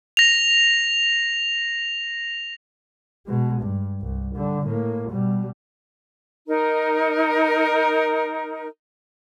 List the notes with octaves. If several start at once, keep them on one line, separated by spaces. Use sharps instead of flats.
A#6 F7
B2 G#3
G2
C2
D3 G3
A2 A#3
B2 G3
D#4 A#4